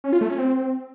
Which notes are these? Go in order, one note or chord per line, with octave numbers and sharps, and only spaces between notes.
C#4
F4
A3
C#4
C4